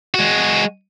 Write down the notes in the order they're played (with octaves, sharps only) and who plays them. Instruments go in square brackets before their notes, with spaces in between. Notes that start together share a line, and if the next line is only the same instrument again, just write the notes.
[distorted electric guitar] G#3 F#4